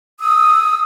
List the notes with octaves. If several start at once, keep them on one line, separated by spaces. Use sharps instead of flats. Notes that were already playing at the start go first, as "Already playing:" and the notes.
D#6 E6